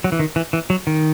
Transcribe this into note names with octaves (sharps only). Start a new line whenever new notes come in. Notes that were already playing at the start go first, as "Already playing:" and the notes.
F#3
E3
D#3
E3
E3
F#3
D#3